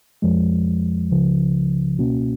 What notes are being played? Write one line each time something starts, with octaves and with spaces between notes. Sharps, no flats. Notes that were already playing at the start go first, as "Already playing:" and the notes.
F2 F3 G#3
C#2 C#3 F3
C#2 B2 A#3 C#4 F#4